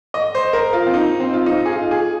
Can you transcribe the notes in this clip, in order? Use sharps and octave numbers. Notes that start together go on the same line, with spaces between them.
D#5
C5
A#4
F4
C4
D#4
C4
F4
D#4
G#4
F4
G#4